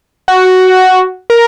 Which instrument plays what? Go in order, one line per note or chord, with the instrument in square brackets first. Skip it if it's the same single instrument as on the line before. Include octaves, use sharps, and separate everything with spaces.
[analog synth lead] F#4
A#4